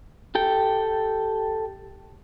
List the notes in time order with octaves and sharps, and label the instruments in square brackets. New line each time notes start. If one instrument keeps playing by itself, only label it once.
[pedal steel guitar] G4 A4 G5